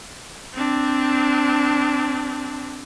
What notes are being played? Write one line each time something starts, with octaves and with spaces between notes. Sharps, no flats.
C4 D4